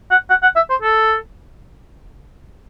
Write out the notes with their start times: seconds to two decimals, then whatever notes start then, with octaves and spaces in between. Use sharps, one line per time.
0.11 F#5
0.30 F#5
0.43 F#5
0.56 E5
0.70 C5
0.82 A4